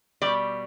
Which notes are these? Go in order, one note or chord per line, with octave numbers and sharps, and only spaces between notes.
B2 G3 D5